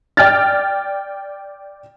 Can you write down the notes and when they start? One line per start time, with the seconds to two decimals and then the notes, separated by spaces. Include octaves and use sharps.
0.17 D5 G5 F6 A6